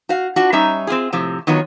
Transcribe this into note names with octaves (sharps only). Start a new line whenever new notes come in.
F#4 F5
D4 F4 F#4
G3 C#4 D#4 E5 A#5
C4 C#4 F4 G#4
A2 C3 F3
D#3 F#3 B3 F4 C#5